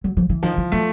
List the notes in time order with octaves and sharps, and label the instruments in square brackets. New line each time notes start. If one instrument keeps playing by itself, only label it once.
[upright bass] F#3
F3
E3
[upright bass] D#3 [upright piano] F3
[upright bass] E3
[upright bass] F#3 [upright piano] A3